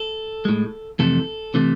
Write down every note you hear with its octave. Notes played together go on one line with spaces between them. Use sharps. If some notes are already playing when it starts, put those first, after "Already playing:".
Already playing: A4
A2 G#3
F2 C3 E3 A3 A4
C3 E3 A3